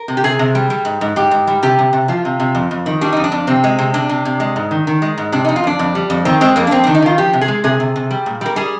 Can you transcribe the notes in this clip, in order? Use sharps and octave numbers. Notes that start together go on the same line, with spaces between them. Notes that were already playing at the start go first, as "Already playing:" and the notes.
Already playing: A#4
C3
G4
C3 G#4
C3
G3
G3
G#2
G#2
G#2 G4
G#2
G3
C3 G4
C3
C3
F3 F4
C3
C3
F2
F2
D#3
G3 D4
F2 D#4
D4
F2
C3 C4
G#3
C3
C3 D4
C3
C3
G#3
G#2
D#3
D#3
G#3
G#2
C3 D4
F2 D#4
F4
F2 D4
F2
G3
F2
D#3 C4
G#3 C4
F2 A#3
D4
F2 C4
D#3 D4
D#4
D#3 F4
F3 G4
C3
G#4
G#3
C3 G#4
C3
C3
G3
A#2
G3 A#4
G3 G#4